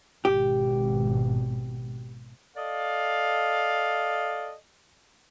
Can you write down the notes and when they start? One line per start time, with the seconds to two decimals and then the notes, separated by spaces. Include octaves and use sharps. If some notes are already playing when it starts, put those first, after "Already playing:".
0.25 G#1 B2 G4
2.55 A4 D5 D#5 F5